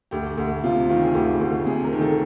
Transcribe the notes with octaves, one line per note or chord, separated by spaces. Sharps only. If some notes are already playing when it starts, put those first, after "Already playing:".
D2 G4
D2
C3 F4
D#3 F4
G#4
D2 G4
D2
C3 G#4
A#4
D#3
A4